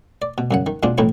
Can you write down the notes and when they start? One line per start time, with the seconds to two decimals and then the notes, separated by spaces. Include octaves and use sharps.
0.22 D5
0.38 B2
0.51 F#2 C#3 F#5
0.66 D#3
0.83 B2 G#3 C4 D4 F4
0.98 F2 A2 E3 C4 D#4 E4